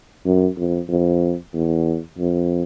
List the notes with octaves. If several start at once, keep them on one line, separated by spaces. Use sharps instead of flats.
F#2
F2
F2
E2
F2